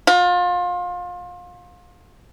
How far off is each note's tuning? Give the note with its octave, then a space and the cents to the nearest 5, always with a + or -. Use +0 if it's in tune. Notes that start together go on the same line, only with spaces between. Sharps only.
F4 +30